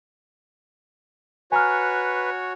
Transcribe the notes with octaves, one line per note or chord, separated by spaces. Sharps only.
F#4 B4 C#5 G#5 A#5 F6